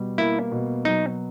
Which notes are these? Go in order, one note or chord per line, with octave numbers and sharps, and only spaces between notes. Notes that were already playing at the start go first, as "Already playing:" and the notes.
Already playing: B2 G3
A#3 E4
B2
F#3 D#4